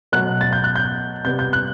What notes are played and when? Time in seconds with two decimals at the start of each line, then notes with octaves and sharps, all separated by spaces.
0.12 B2 F#3 A3 F#6
0.41 A6
0.53 G6
0.64 F#6
0.76 G6
1.24 C3 G3 B3 G6
1.39 G6
1.53 F#6